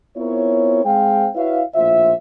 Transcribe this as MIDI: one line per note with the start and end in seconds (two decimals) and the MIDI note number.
0.17 0.84 59
0.17 0.84 60
0.17 0.84 64
0.17 0.84 65
0.17 0.84 70
0.17 0.84 73
0.85 1.29 56
0.85 1.29 60
0.85 1.29 68
0.85 1.29 72
0.85 1.29 77
0.85 1.29 79
1.36 1.63 64
1.36 1.63 66
1.36 1.63 71
1.36 1.63 73
1.36 1.63 76
1.36 1.63 77
1.75 2.13 34
1.75 2.13 45
1.75 2.13 65
1.75 2.13 72
1.75 2.13 76